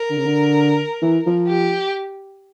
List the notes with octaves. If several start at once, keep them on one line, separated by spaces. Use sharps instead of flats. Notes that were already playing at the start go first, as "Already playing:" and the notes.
Already playing: A#4
D3
C#3
D3
E3
F3
G4